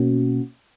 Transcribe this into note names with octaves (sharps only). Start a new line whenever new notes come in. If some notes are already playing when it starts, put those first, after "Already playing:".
Already playing: B2 A#3 C#4 F#4